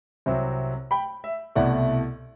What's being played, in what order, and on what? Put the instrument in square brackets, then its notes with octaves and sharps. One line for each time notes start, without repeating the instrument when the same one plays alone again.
[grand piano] C2 C3 F#3 C4
G5 B5
E5
C2 B2 A3 E4 D5 F#5